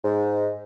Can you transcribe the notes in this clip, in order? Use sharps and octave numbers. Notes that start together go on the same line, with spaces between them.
G#2